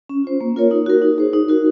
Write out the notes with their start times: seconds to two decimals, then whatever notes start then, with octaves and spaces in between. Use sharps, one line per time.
0.09 C#4
0.24 F4 C5
0.41 A#3
0.56 F4 A#4 C#5
0.71 D#4
0.86 F#4 A#4
1.02 D#4
1.18 G#4 C5
1.33 D#4
1.49 F#4 A#4